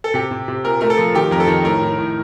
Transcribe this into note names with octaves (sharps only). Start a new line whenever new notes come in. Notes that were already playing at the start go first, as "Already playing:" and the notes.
A4
C3 G4
C3
C3
A#2 A#4
A3 A#4
A4
F3
D#3 G4
F2 A#4
A4
D#3
A2 A#4
A2
A2